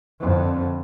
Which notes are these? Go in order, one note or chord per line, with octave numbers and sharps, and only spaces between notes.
F2 D3